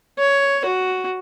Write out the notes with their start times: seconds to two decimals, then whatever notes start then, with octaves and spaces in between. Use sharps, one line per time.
0.19 C#5
0.65 F#4